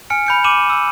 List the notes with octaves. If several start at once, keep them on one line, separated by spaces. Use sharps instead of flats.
G#5 F6 C#7
B5 G6 C#7
D6 D#7 E7 F#7
E6